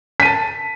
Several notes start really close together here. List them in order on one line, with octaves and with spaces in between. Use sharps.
B6 D#7 A5